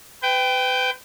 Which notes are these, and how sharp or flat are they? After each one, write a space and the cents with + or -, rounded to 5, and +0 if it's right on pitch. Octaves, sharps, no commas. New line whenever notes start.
B4 +35 G5 +0